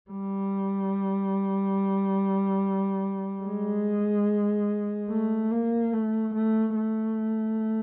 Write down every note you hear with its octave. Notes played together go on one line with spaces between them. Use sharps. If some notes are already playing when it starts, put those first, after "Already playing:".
G3
G#3
A3
A#3
A3
A3
A3